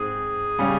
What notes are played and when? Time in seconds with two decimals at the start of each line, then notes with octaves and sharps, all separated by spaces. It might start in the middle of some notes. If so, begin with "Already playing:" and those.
Already playing: G#2 C4 G#4
0.59 C#3 G3 C#4